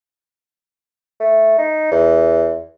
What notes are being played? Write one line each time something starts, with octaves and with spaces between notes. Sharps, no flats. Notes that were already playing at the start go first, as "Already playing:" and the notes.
A3
D#4
E2